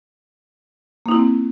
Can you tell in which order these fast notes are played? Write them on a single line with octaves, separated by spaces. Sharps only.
A#3 D#4 E4 C4